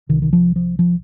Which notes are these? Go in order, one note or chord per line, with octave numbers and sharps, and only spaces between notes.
C2 C3 D#3
D#3
F3
F3
F3